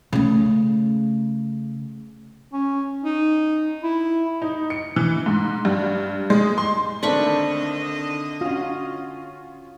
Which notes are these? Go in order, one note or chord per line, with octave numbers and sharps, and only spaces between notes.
C#3 A3
C#4
D#4
E4
D#4
C#7
E3
G#2
G2
G#3
C6
D3 D#3 A3 C4 D4 D#5 B5 C#6
C#4 F4 F#4